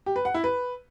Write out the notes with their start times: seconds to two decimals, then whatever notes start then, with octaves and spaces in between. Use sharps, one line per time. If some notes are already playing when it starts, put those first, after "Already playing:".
0.06 G4
0.16 B4
0.25 F#5
0.34 E4
0.44 B4